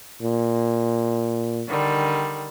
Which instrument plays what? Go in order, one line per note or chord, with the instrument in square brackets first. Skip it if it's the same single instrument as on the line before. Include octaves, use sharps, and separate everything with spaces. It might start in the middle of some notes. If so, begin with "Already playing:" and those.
[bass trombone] A#2
[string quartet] D3 D#3 G3